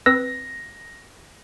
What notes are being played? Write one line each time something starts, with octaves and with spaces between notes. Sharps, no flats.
C4 B4 E6 A#6